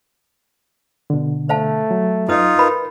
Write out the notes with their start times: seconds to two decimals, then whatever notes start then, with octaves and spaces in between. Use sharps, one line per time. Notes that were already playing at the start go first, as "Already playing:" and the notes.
1.10 B2 D3
1.49 A3 C5 F5 A5
1.91 F#3
2.29 F#2 D#4 F4 A4 B4 D#6
2.59 A#4 B4 B5